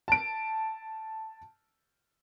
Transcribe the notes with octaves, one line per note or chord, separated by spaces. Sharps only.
A5 D7